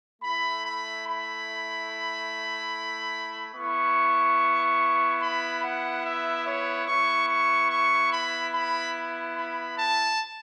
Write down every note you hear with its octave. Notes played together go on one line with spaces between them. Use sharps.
A3 E4 B5
B5
B5
B3 E4 C#6
B5
F#5
E5
C#5
B3 E4 C#6
C#6
C#6
B5
B5
B5
A5